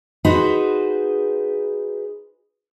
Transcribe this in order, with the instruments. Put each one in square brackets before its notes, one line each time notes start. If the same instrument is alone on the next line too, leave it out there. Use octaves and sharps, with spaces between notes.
[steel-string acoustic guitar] D#4 F#4 G#4 B4 C5